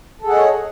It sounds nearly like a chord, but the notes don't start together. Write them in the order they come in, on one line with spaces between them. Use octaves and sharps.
A4 G#4 F#5 D#5 C#5